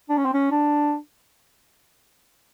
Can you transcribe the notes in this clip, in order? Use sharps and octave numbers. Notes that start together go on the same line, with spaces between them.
D4
C#4
C4
C#4
D4